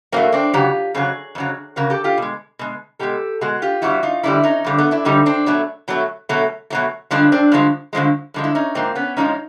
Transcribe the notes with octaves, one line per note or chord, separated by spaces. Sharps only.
A2 F#3 A3 A#3 C4
C4 D4
F2 C#3 F#3 F4 G4
F2 C#3 F#3 G#4
F2 C#3 F#3
F2 C#3 F#3 A#4
G4 A4
F4 G4
B2 G#3
B2 G#3
B2 G#3 G4 A4
B2 G#3 F#4 G#4
F4 G4
F2 D3 G3 E4 F#4
D#4 F4
F2 D3 G3 D4 E4
C#4 D#4
F2 D3 G3
A3 B3
D4 E4
F2 D3 G3 D#4
C4 D4
B2 F#3 A3
B2 F#3 A3
B2 F#3 A3
B2 F#3 A3
G2 D3 F3 G#3 C4 D4
C4 D4
G2 D3 F3 G#3
G2 D3 F3 G#3
G2 D3 F3 G#3
E4
C#4 D#4
G#2 F3 A#3 C4
B3 C#4
G#2 F3 G#3 C#4 D#4